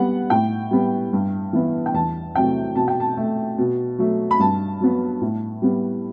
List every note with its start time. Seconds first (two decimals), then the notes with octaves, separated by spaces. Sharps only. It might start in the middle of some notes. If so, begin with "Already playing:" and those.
Already playing: G3 B3 F#5
0.30 A2 G5
0.71 G3 B3
1.13 G2
1.53 E3 B3
1.86 G5
1.94 E2 A5
2.35 C3 F#3 A3 G5
2.76 B2 A5
2.88 G5
3.00 A5
3.17 A3
3.58 B2
3.98 F#3 A3
4.31 B5
4.39 G2 A5
4.80 F#3 B3
5.21 A2
5.62 G3 B3